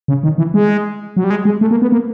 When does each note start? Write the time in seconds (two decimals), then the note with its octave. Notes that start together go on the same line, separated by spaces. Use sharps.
0.08 C#3
0.23 D#3
0.38 E3
0.54 G#3
1.17 F#3
1.24 G3
1.30 G#3
1.45 G#3
1.61 A3
1.71 A#3
1.82 B3
1.92 A#3